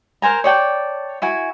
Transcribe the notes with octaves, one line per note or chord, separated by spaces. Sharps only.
A#4 C5 G#5 A#5
C#5 D5 G5 A5
E4 F#4 G#5